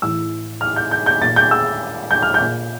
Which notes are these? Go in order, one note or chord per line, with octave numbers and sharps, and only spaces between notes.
A2 E3 E6
F6
G6
G6
G6
A#2 A6
G6
E6
G6
F6
G6
A#2